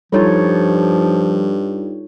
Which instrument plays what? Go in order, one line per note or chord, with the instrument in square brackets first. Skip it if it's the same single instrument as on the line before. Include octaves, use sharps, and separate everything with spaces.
[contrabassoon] G2 [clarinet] F3 [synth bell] G3 D#4 F4 [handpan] A4 C#5